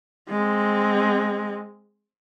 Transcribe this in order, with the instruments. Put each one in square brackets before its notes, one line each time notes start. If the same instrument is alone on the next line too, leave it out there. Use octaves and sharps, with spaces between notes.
[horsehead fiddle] G#3 C4